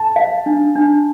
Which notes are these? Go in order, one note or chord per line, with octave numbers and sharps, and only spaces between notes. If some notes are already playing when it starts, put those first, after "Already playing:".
Already playing: A5
F5
D4
D4